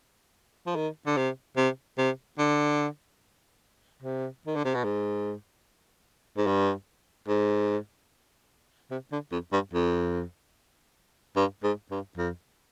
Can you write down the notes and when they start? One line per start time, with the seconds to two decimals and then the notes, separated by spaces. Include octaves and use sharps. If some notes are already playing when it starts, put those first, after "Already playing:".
0.67 F3
0.76 D#3
1.07 D3
1.17 C3
1.57 C3
1.98 C3
2.39 D3
4.02 C3
4.47 D#3
4.56 D3
4.65 C3
4.75 B2
4.84 G#2
6.37 G#2
6.47 G2
7.28 G#2
8.91 C3
9.12 D3
9.32 F2
9.52 G2
9.73 F2
11.36 G2
11.63 G#2
11.91 G2
12.17 F2